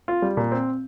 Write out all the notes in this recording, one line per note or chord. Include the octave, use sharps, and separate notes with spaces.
F4
G3
A#2
C4